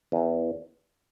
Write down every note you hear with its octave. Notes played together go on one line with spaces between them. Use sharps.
E2